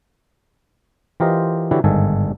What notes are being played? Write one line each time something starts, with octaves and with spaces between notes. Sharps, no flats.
E3 F4 G4 A#4 C5 D#5
D3 E3 E4 F#4 G4 C#5
G1 G#2 D#3 A4 G#5